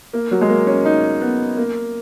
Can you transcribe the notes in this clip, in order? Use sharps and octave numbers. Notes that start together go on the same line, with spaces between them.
A#3
F#3
G#3
A#3
C#4
D#4
B3
A#3